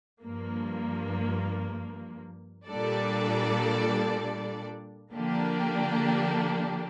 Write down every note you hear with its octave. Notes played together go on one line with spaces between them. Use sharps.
G2 F3 A#3
A#2 G3 D4 A4 D5
D3 F3 A#3 D4 G4